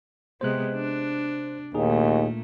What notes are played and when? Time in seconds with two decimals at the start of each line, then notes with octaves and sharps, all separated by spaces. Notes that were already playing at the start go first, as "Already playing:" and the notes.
0.41 C3 G#3 B3 C5 F#6
0.74 D4
1.74 D#2 A#2 A3 D#4 G#4